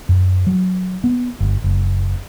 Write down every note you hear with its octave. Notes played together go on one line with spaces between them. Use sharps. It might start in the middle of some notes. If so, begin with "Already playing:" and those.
F#2
F#3
B3
G1
F#1